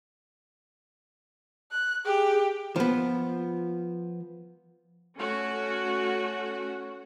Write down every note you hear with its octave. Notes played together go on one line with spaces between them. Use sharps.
F#6
G4 G#4
F3 B3
A3 C#4 F#4